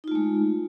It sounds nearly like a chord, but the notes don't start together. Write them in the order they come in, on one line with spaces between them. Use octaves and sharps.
D#4 F4 A3 G#3